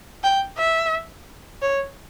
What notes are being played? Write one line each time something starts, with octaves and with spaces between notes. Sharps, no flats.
G5
E5
C#5